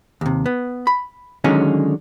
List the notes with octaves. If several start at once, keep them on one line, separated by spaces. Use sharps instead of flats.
D#2 C3
B3
B5
D3 D#3 F#3 G#3 C#4 D#4